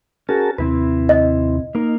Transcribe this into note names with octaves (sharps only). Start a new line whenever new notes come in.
C#4 F#4 G#4 A#4 A5
D#2 C3 C4 E4 B4
D#5
A#3 D#4 A#4